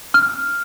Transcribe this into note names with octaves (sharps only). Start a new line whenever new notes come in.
F6